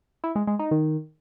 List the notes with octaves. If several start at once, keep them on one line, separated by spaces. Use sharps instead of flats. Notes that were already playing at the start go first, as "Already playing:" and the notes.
E4
G#3
G#3
D#4
D#3